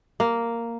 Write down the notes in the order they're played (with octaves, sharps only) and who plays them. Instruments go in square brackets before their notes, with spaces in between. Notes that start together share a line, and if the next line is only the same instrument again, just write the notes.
[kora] A#3